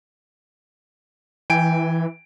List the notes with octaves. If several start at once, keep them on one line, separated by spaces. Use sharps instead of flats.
E3 G5 G#5 D7